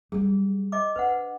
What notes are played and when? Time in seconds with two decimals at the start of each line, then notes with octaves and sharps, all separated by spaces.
0.12 F#3 G3 G#4
0.72 D#5 D6
0.96 D4 B4 C5 F#5